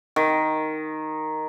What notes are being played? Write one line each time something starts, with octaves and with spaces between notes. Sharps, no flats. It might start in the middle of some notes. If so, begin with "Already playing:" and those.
D#3